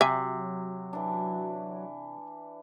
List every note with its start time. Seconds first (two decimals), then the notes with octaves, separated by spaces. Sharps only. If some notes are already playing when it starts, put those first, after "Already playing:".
0.01 C3 F#3 E5 G#5
0.93 E3 D4